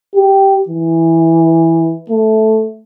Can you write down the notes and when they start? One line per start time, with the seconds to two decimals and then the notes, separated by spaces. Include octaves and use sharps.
0.15 G4
0.68 E3
2.10 A3